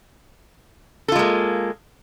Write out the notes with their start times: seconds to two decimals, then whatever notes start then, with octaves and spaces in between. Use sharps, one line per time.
1.08 A4
1.12 F4
1.16 G#3
1.19 A#3